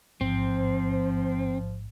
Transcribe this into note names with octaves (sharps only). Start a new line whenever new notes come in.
A1 G#2 F3 C4